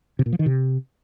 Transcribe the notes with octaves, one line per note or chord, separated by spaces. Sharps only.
C3
A#2
F3
D#3
C3